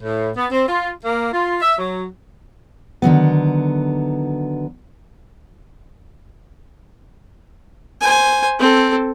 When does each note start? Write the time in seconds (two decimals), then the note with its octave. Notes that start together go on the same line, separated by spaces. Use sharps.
0.02 A2
0.37 B3
0.51 C4
0.68 F4
1.05 A#3
1.33 F4
1.61 E5
1.78 F#3
3.02 D3 D#3 F#3 B3
8.01 C5 G#5
8.59 C4 A4